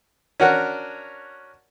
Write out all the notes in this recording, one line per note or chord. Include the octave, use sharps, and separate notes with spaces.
C#4 D4 F#4 A#4 F#5